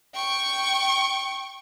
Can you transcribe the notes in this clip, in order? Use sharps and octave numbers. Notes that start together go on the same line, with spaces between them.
G5 C#6